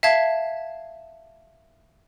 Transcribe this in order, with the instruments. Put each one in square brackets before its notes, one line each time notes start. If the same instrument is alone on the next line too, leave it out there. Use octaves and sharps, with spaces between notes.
[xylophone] E5 F5 A5 G#6